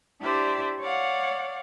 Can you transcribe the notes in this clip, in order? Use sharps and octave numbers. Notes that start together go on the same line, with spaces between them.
D4 E4 G4 C5 D5 E5
C#5 D5 F5 F#5